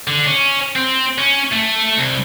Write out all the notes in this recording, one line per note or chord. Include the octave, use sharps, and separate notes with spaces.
D3
C#4
C4
C#4
A3
C2